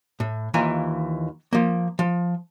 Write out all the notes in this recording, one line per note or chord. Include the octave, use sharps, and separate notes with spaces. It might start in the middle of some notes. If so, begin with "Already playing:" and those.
A2
D#2 E3 F4 G#5 A#5
F3 A#3
F3